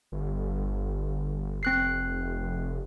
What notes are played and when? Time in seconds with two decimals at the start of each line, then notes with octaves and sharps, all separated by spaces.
0.12 G1
1.63 F1 C4 F#6 C7